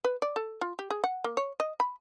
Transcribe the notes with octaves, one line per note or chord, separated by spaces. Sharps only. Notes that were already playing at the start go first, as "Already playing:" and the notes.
B4
D5
A4
F4
G4
G#4
F#5
A#3
C#5
D#5
B5